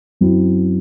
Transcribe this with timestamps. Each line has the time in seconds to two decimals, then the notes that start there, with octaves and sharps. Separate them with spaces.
0.21 F#2 F#3 C4 E4